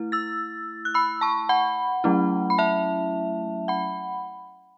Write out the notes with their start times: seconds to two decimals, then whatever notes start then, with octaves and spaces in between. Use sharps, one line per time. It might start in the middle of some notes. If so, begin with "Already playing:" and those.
Already playing: A3 E4
0.12 E6 A6
0.85 F#6
0.94 B5 E6
1.21 A5 C#6
1.49 F#5 B5
2.04 F#3 A3 C#4 E4
2.50 B5
2.58 E5 A5
3.68 F#5 B5